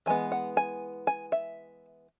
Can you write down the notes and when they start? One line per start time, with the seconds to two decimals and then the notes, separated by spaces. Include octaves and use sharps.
0.06 E3 G#3 B3 G#5
0.32 F#5
0.57 G#5
1.07 G#5
1.32 E5